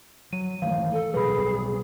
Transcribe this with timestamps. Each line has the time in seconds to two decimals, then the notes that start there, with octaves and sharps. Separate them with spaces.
0.33 F#3 D#7
0.62 D#3 E3 A3 F5
0.92 A4
1.14 B2 F#3 G3 G#4 B4 B5